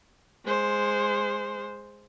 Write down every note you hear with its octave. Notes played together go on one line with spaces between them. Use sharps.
G#3 C5